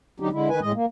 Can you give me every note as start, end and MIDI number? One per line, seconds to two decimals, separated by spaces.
0.20 0.29 50
0.20 0.29 54
0.20 0.29 63
0.20 0.29 67
0.32 0.49 50
0.32 0.49 56
0.32 0.49 64
0.49 0.60 51
0.49 0.60 71
0.49 0.60 80
0.61 0.72 45
0.61 0.72 56
0.61 0.72 75
0.74 0.86 58